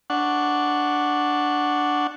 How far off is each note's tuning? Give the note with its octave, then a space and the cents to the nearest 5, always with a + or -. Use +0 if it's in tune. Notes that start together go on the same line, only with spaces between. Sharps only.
D4 +0 F#5 +0 C#6 +0